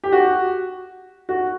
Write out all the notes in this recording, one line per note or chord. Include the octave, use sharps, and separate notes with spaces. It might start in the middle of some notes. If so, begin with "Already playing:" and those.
G4
F#4
F#4